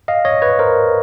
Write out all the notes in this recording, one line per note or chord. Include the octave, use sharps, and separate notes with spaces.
D#5 F5
C#5 D#5
B4 C#5
A#4 C5